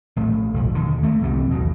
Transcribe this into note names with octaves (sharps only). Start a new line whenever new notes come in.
A#1 A2 A3
F#1 B1 F3
D#2 D3
A3 A#3
C2 F2 C3 E3
B1 E2 B2